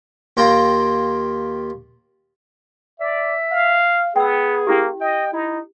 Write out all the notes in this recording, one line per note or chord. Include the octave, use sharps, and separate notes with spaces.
D#2 F4 G5 A#5
D5 E5
F5
B3 G#4 G5 E6
A#3 C#4 E4 G4
D#5 G5
D#4 E4